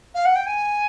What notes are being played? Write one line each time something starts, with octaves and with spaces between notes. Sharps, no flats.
F5
F#5
G5
G#5